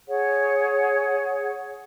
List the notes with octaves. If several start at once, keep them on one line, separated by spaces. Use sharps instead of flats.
G#4 C#5 F#5